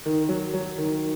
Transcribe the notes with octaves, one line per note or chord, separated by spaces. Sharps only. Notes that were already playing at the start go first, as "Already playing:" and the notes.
D#3
F#3
F#3
D#3